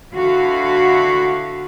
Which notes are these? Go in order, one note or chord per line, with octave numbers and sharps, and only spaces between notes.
D3 E4 F#4 F5